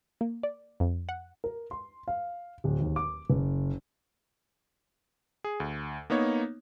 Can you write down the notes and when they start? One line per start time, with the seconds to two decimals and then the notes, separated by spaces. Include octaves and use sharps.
0.21 A#3
0.43 D5
0.80 F2
1.09 F#5
1.44 A#4
1.71 C6
2.08 F5
2.64 D1
2.80 D#2
2.96 D6
3.30 F#1
5.44 G#4
5.60 D2
6.10 A#3 B3 D#4 C#5